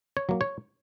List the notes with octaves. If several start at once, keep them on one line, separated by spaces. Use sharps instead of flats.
C#5
F#3 A#3
C#5